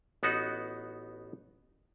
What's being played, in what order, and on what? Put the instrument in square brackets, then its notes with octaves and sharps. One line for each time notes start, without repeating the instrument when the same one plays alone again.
[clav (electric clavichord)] A1 B3 D#4 F#4